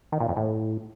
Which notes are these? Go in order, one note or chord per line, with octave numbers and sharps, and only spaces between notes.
D#3
A#2
F2
A2